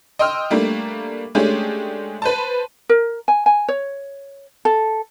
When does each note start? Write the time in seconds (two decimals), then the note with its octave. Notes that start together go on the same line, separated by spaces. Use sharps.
0.19 D#5 G5 C6 E6 F6
0.50 G3 A3 A#3 D4
1.35 G#3 A3 C#4 D4 G4 G#4
2.22 B4 C5 A5
2.89 A#4
3.28 G#5
3.46 G#5
3.68 C#5
4.65 A4